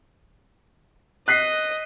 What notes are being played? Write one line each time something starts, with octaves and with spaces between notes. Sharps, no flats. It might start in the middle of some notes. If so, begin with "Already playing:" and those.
D#5 F#6 B6 C7